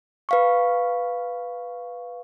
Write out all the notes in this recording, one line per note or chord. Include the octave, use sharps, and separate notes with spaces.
B4 F5 C#6